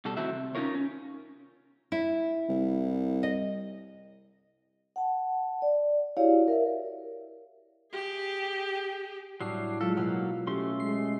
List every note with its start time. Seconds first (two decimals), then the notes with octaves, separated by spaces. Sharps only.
0.05 B2 G3 A4
0.17 A2 D#3 C4 F#4 E5
0.30 C3
0.55 C#4 D#4 F4 A#4 C#5
0.75 C#4
1.92 E4
2.49 C2
3.23 D#5
4.96 F#5 A5
5.62 D5
6.17 E4 F#4 G4 C#5 D5 F5
6.48 A#4 E5 F5
7.93 G4 G#4
9.41 A2 F#3 G3 D4 C7
9.81 F#3 G#3 F4 G4 A4
9.97 B2 F#3 A#3 F5 E6
10.47 A3 C#4 G4 C6
10.80 G#3 C7